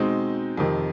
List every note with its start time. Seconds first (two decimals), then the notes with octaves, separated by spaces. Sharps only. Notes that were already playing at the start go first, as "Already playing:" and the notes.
Already playing: B2 G#3 C4 D#4
0.58 F2 C3 D#3